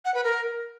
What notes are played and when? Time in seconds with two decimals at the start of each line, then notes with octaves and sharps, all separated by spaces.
0.05 F#5
0.14 B4
0.24 A#4